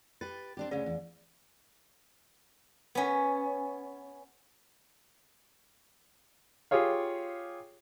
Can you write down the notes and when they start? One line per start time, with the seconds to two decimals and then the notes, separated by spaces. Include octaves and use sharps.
0.21 G4 B4 A6
0.57 C4 D4 G4
0.71 D2 C#3 A3 C#4 G#4 D5
0.86 E2
2.95 B3 C#4
6.71 F4 G4 G#4 C#5 F5